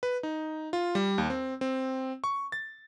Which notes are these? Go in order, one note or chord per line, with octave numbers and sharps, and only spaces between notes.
B4
D#4
F4
G3
D#2
C4
C4
C#6
A6